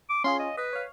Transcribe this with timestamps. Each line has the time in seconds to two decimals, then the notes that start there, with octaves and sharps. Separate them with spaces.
0.10 D6
0.24 C#4 F4 G#4 C6
0.40 D#5
0.57 B4 D#5
0.73 C#5 F5